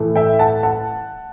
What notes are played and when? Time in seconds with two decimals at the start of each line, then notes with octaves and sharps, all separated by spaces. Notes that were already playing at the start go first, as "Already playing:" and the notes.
Already playing: A2 E3 A3
0.16 E5 G5
0.39 F#5 A5
0.63 F#5 A5